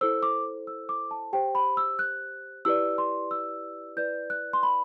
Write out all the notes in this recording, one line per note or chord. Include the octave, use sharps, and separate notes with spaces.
E4 A4 C5 E6
D6
E6
D6
A5
G4 C5 G5
B5
E6
F#6
E4 G4 B4 D5 E6
C6
E6
E4 B4 D5 G6
F#6
C6
B5